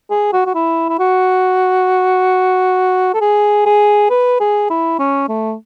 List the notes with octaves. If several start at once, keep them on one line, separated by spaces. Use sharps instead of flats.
G#4
F#4
F#4
E4
E4
F#4
A4
G#4
G#4
B4
G#4
E4
C#4
A3